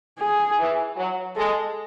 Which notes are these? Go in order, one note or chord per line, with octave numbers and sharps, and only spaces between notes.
G#4
E3
F#3
G#3 A4